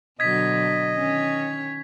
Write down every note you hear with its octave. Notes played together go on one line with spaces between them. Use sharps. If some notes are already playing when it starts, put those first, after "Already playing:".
B2 D3 F#3 D#5 G#6 B6
D#3 C#4 C#5